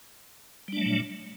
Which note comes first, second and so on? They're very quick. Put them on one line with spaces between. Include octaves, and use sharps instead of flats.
G3 D4 A3 F#3 A#2